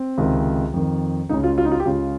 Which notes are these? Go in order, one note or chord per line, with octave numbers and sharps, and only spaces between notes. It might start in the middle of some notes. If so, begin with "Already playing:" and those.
Already playing: C4
C#2 C3 D#3
F2 D#3
C#2 C#3 D#4
F4
F4
D#4
F4
G4
C#2 C#3 F4